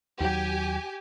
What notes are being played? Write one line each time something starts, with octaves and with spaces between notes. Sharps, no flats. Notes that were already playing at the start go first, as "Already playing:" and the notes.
D#2 F#3 G4 G#5